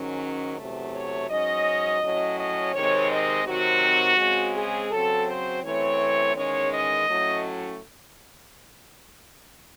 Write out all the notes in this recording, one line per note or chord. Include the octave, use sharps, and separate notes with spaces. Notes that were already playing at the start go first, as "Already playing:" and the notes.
Already playing: G#2 D#3 F#3 C#4
E2 C3 F#3 A3
C#5
G#2 F#3 C#4 D#5
A2 F#3 C#4
D#5
C3 D#3 G#3 C4 C#5
D#5
C3 D#3 F#3 C4 F#4
C#3 G#3 C4
G#4
C#3 F#3 C4 A4
C5
F#2 E3 A3 C4 C#5
E2 D#3 G#3 C#4 C#5
D#5
A2 F#3 A3 C#4